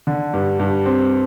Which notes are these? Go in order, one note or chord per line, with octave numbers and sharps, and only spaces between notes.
D3
G2
G2
C4